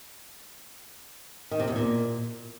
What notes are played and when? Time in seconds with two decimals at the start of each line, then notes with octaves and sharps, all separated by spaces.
1.51 D#3
1.59 C3
1.68 E2
1.76 A#2